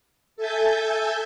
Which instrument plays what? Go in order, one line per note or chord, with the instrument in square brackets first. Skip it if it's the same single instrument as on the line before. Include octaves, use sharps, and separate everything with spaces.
[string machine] A4 E5 G#5 G6 A6